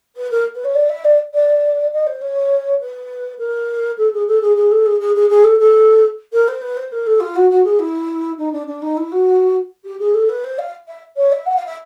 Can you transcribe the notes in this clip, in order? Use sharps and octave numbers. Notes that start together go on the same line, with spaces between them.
B4
A#4
B4
C#5
D5
E5
D5
D5
D#5
C5
C#5
B4
A#4
A4
G#4
A4
G#4
G#4
A4
G#4
G#4
G#4
G#4
A4
A4
A#4
C5
B4
C5
A#4
A4
F4
F#4
F#4
G#4
E4
D#4
D4
D4
D#4
E4
F#4
G4
G#4
A4
B4
C5
F5
E5
C#5
E5
F#5
F5
E5